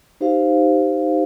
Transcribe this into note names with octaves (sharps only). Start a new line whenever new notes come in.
D#4 G4 C5 F5